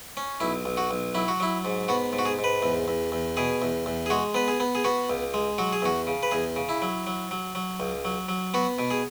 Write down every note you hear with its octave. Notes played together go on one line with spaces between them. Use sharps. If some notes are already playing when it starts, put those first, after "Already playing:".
C#4
B1 E4
B1
F#4
B1
F#3 E4
F#4
F#3 E4
G#2
B3 F#4
G#2
F#4
G#4
G#2
B4
E2
E2
E2
B2 G#4
E2
E2
G#4
G#3 F#4
B3 B4
G#4
B3
G#4
B3 F#4
C#2
G#3
F#3 F#4
G#4
E2 F#4
C#3
B4
E2 G#4
C#3
E4
F#3
F#3
F#3
F#3
C#2
F#3
F#3
B3 F#4
B2
G#4